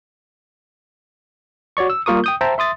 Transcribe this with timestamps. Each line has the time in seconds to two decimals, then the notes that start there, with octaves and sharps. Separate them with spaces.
1.77 F#4 C#5 D5 C#6
1.90 E6
2.06 G3 A#3 F4 A#4 C#6 D#6
2.24 G5 D#6 G6
2.41 C5 E5 G5 A5 A#5
2.58 E5 C6 D#6 A6